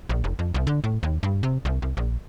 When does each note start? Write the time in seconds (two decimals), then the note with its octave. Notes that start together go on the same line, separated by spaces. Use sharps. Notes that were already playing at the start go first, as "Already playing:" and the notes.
0.09 A#1
0.24 F1
0.39 F2
0.54 C2
0.67 D3
0.84 A2
1.03 D#2
1.23 G2
1.43 C3
1.65 C2
1.82 C2
1.97 A#1